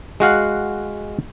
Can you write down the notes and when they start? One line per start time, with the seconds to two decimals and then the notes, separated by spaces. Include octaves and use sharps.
0.20 G#3 F#4 F5 F#5